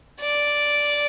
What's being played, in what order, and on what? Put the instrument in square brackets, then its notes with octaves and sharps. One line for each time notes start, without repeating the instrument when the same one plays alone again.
[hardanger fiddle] D5